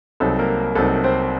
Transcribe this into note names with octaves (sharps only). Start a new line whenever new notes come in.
C2 C3 F#3 C4 D#4 A4
A#3 A#4
C2 C3 F#3 C4 D#4 A4
C4 C5